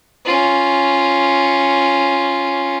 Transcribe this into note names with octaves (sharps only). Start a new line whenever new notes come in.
C#4 F4